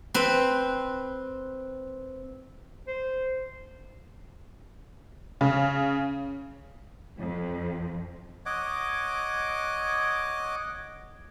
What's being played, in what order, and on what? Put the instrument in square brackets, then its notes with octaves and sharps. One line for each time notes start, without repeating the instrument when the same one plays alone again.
[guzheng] C4 B4
[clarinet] C5
[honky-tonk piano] C#3
[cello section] F2
[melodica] C#5 D#5 F#5 D6